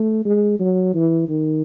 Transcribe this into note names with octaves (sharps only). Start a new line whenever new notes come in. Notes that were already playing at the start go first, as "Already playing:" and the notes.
Already playing: A3
G#3
F#3
E3
D#3